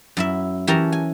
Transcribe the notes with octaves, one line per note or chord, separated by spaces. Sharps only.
F#2 E4 E5
E3 C#4 G4 A#4 A5 A#5
G#5